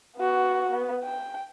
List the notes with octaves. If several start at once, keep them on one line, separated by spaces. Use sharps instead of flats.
B3 F#4
B3
G5